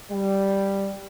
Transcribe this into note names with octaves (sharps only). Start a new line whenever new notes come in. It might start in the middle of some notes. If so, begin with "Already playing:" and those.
G3